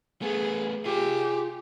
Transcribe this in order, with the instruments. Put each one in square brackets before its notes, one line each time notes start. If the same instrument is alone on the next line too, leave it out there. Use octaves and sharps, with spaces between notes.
[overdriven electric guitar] A3 B3 [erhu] G#4
[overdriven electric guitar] F4 G#5 [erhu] G4 [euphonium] G#4